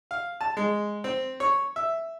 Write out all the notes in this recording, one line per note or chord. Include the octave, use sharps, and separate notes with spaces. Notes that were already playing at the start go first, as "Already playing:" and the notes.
F5
A5
G#3
C4
C#5
E5